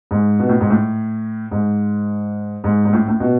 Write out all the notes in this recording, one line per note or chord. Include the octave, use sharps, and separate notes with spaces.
G#2
B2
A2
G#2
A2
G#2
G#2
G#2
A2
A2
B2